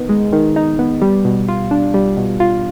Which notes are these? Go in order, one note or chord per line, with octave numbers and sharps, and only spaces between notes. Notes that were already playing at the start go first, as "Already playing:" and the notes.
Already playing: D#3 B3 D#4
G#3
D#3
D#4
B3
G3
B2
F4
D4
G3
B2
F4